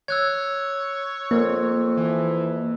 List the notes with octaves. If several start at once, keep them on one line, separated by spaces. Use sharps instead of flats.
C#5 E6 F#6 G#6
F2 A#3
E3